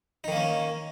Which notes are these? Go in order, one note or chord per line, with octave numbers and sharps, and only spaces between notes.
D#3 A#3 C#4 D#4